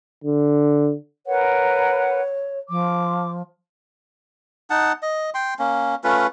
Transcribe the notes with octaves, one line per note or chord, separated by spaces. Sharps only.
D3
A#4 B4 C#5 F#5
F3 D6
D#4 F#5 A5
D#5
G5 C6
A#3 C#4
A3 C#4 F4 B4